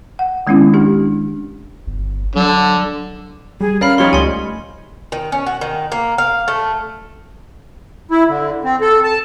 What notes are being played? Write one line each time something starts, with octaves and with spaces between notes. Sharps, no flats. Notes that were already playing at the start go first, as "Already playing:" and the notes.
F#5
D#3 G#3 B3 C#4 D4 E4
D4 G4
G1
D3 F#3
G3 G#4
C#4 A#4 D5 F5 B5 F6
F3 G3 D#4 C#5 C6
C#2 A3 G#5 C6
D#3
C#4
F#4
D#3
A#3
F5
A3
E4
D3
C4
A4
A5